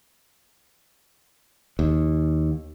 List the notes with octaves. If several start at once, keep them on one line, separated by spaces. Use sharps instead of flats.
D#2